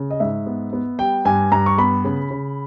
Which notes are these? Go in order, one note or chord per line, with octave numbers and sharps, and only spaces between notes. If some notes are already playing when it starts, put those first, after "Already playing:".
Already playing: C#3
D#5
G#2 E5
B3
B3
G3 G5
G2 G#5
G2 A#5
C#6
B3 B5
C#3
C#3